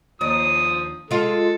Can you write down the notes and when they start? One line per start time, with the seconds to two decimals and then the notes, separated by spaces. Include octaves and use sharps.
0.21 D#2 F3 D4 D#6
1.11 G#3 F4 A4